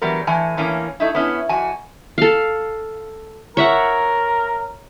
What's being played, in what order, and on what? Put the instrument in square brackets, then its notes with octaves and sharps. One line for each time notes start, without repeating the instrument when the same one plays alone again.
[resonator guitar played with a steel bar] E3 F#3 G3 B3 A#4
A2 E3 G#5
A2 E3 A#3 C#4
A3 D#4 E4
B3 C#4 E4
F2 F#4 G#5
[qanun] A4 F5
[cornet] A#4 [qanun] C#5 E5 F#5